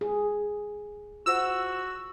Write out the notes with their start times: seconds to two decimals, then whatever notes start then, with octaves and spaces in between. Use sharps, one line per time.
0.01 G#4
1.26 F4 F#4 C5 F#5 E6